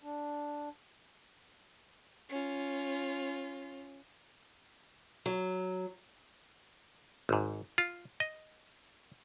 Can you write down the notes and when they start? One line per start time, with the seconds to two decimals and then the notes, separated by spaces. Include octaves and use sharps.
0.03 D4
2.29 C#4 F4
5.26 F#3
7.29 G#1 G#2
7.78 F4
8.20 D#5